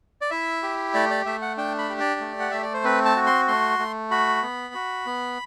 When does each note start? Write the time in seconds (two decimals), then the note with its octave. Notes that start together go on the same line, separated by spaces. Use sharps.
0.21 D5
0.30 E4 E5
0.63 G4
0.94 A3 D5
1.10 D5
1.26 A3 E5
1.42 F#5
1.57 D4 G5
1.78 B5
1.89 G4
2.00 D5
2.21 A3
2.40 F#5
2.51 A3 E5
2.62 D5
2.74 C5
2.84 C4 B4
3.05 A5
3.16 F#4
3.26 C6
3.48 A3 C6
3.79 A3
4.11 F#4 B5
4.42 B3
4.74 F#4
5.06 B3